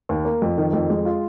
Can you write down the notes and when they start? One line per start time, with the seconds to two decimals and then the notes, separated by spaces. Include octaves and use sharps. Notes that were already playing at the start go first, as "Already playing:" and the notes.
0.09 D#2
0.25 A#3
0.42 F2
0.58 D#3
0.73 F2
0.90 G#3
1.05 F4